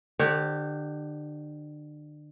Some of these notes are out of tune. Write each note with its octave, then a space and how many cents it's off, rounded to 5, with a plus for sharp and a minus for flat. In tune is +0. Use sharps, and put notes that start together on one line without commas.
D3 +35 G4 +0 C#5 -45